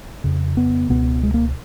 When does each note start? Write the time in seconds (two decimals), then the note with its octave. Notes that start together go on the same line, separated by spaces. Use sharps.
0.24 F2 C#3
0.57 B3
0.90 C#2 B2 B3
1.23 G#3
1.34 A#3